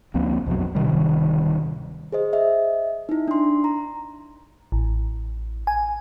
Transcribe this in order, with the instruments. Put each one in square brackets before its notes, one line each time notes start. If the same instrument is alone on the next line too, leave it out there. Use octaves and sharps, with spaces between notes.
[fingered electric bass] D2 F3 A#3 C4
B1 F2 B2 F#3
D1 C3 D#3 G3
[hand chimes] G#4 C5 D#5
D#5 E5
D#4 E4
D4 C6
A#5
[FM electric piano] A1
G#5